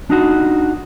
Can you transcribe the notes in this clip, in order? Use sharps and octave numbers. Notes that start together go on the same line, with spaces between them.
D4 D#4 F#4